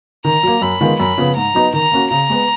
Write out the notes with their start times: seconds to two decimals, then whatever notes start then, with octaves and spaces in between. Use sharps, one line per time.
0.25 D#3 A#5
0.43 F#3 A#3
0.62 F#2 B5
0.81 D#3 G#3 B3 F4
0.99 F#2 B5
1.18 C#3 F3 B3
1.36 G#2 A#5
1.55 F#3 B3 D#4
1.73 D#3 A#5
1.92 A#3 C#4 F#4
2.11 C#3 A#5
2.30 G#3 B3